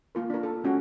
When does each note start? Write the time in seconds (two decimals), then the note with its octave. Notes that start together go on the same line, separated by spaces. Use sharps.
0.15 A#3 F4 A#4
0.30 D4 A#4
0.43 A4
0.64 G#3 C#4 F#4